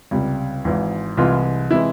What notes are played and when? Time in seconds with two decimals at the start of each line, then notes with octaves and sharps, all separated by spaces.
0.11 C#2 C3 G3
0.65 G#1 G#2 E3
1.18 C2 C3 E3 G#3 F4
1.71 C3 E3 G#3 E4